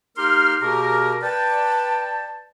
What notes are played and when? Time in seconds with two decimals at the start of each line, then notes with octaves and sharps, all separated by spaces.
0.17 A#3 D#4 G4 A#4 C6 F6
0.61 B2 A#3 G4 G#4 A#4
1.22 B4 D5 G5 A5